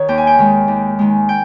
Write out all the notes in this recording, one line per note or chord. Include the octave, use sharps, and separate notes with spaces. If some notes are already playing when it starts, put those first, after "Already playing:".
Already playing: D#3 C#5
D#2 G5
G#5
G5
D#3 G#3
D#2
D#3 G#3
G5